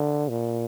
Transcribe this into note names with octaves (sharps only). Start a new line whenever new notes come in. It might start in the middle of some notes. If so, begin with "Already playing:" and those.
Already playing: D3
A#2